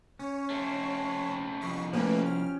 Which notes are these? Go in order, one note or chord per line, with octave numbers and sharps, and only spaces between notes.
C#4 C#5
A3 C4
C2 F2 B5 C#6 C7
F3 A3 A#3 C#4 G4 B4
F6